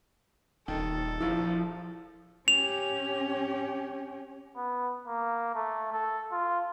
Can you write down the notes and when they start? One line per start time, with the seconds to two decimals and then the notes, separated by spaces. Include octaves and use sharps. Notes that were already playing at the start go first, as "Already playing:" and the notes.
0.68 D#1 D#3 A4
1.21 A#1 F3 E4 E6
2.48 C#4 G4 F7
4.56 B3
5.07 A#3
5.55 A3
5.92 A4
6.32 F4